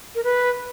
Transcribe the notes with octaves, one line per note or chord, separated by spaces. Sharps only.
A#4
B4